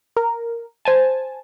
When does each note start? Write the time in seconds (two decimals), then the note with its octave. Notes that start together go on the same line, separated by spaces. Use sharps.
0.17 A#4
0.85 C5 G#5 A5